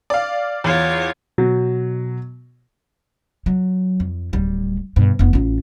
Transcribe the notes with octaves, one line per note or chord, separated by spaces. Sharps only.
D5 F5
E2 F4 C#5
B2 F#3
F#3
F2
D1 G3
G2 B2
F1 B3
A1 F4